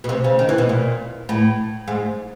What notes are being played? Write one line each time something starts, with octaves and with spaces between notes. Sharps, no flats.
B2
C3
C#3
D#3
E3
B2
A#2
A2
G#2